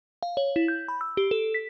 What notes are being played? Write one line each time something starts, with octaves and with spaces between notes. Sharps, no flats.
F5
C#5
E4
G6
B5
E6
G4
A4
B6